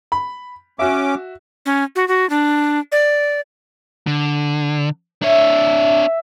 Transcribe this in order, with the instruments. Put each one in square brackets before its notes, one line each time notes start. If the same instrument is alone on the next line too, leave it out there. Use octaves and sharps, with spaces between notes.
[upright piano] B5
[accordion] C#4 D6 [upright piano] F#4 E5
[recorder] C#4
F#4
F#4
D4
D5
[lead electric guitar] D3
[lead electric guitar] D4 C#5 [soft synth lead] E5